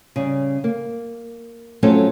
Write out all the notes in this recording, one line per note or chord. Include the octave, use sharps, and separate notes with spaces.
C#3 G3
A#3
F3 F#3 A3 C4 C#4 A4